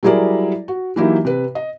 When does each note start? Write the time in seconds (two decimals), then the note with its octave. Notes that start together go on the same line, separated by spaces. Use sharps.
0.03 F#3 G3 E4 G#4 A#4 D5
0.68 F#4
0.96 E3 F#3 A#3 D#4 E4 G4
1.25 C3 B4
1.55 D#5